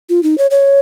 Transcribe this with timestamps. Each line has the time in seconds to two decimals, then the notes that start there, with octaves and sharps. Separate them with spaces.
0.09 F4
0.23 D#4
0.38 C#5
0.51 C#5